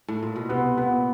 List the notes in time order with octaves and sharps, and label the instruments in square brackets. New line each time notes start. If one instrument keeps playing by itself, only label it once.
[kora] A2
A#2
B2
[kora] C3 [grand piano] B3
[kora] A#2 [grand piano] B3